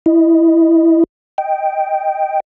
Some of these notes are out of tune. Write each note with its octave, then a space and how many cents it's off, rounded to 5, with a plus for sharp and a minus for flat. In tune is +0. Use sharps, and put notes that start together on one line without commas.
E4 +0 D#5 +0
D#5 +0 G5 +0